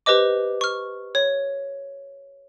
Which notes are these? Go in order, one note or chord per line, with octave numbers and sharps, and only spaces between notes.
G4 B4 C5 D#5 D6
C#6 F6
C#5